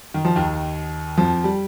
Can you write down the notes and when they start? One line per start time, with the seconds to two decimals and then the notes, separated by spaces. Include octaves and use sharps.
0.14 D#3
0.25 F3
0.36 D#2 D#3
1.18 F2 F3
1.44 G3